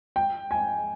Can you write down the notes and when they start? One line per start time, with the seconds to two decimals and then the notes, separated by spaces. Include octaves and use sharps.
0.16 G5
0.51 G#5